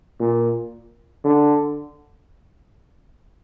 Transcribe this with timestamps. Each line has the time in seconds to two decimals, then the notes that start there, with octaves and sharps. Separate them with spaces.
0.20 A#2
1.24 D3